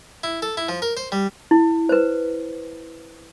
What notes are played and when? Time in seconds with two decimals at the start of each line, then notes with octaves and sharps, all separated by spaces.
0.24 E4
0.42 A4
0.57 E4
0.69 F3
0.82 A#4
0.97 C5
1.12 G3
1.51 E4
1.89 B4 C5